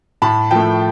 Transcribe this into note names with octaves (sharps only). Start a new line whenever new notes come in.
A2 A5 B5
F3 A3 G5 A5